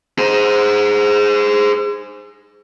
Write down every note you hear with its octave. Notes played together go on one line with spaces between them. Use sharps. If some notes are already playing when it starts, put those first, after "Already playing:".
G#4 C5